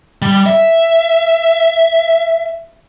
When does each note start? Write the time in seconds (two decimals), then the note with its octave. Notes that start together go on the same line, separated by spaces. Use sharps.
0.22 G3
0.46 E5